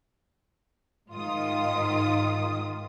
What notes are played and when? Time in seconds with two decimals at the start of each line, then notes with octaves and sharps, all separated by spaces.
1.11 G#2 D#3 F4 D#6